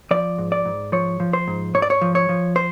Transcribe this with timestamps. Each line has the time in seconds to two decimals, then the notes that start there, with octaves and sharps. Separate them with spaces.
0.11 F3 D5
0.38 G#2
0.52 D5
0.65 G#2
0.92 F3 C#5
1.20 F3
1.33 C5
1.47 G#2
1.75 G#2 C#5
1.82 D5
1.90 C#5
2.01 F3
2.15 C#5
2.29 F3
2.56 C5